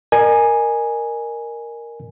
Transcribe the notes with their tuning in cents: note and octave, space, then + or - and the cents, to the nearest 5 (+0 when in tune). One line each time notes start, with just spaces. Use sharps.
A#4 +0 D#5 -45 G#5 +0